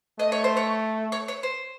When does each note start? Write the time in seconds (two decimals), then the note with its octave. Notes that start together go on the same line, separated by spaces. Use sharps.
0.19 A3 D#5
0.32 C#5
0.44 C5
0.57 C#5
1.12 C#5
1.28 C#5
1.43 C5